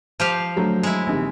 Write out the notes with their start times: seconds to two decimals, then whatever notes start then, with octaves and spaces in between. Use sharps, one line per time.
0.20 F3 G4 F5
0.56 D3 F#3 A3
0.83 G#3 E4
1.07 A#1 C3 D#3